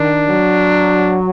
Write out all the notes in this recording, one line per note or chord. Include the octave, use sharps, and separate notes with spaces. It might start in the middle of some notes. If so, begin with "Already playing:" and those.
Already playing: D#3 D4
F#3